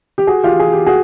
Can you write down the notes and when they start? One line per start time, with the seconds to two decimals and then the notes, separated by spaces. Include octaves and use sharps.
0.18 G4
0.27 F#4 G#4
0.44 F4 G4
0.59 G#4
0.73 G4
0.86 F#4 G#4